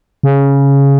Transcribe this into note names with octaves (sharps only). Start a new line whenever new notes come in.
C#3